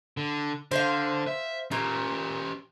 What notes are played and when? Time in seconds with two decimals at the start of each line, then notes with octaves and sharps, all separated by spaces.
0.17 D3
0.71 D3 C5 F5
1.27 E5
1.72 A#2 C#4 G4